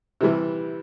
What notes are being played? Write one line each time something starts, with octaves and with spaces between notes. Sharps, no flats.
C3 E3 G3